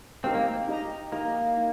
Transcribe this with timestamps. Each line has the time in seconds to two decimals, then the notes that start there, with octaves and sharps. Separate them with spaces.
0.24 C4 D#4 G4 A#4 F5
0.35 A#3
0.47 C4
0.68 D#4 G4 D#5 A#5
1.12 A#3 D#4 G4 D#5 A#5
1.57 D#4